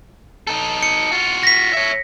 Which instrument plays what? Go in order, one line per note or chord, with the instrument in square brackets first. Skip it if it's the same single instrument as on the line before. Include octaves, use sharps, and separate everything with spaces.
[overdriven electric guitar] D#4 A4
[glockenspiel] C#7
[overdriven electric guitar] F4 F#4
[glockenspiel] A#6 B6
[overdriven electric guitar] C#5 E5